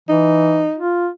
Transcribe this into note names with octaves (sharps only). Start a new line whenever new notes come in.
E3 D#4
F4